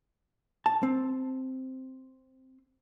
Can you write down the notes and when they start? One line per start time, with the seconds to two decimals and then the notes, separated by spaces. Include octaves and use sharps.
0.66 A5
0.83 C4